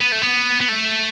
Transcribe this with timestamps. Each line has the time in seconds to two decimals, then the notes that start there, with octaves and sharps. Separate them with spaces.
0.01 B3
0.12 A3
0.22 B3
0.61 B3
0.68 A3